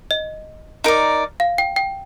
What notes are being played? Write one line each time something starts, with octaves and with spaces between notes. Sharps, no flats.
D#5
D#4 A#4 D5
F5
G5
G5